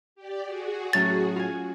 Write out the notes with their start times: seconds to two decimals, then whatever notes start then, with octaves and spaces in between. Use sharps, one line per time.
0.15 G4 D5
0.44 F#4 G#4
0.93 A2 F#3 C#4 A6
1.36 F4 G#5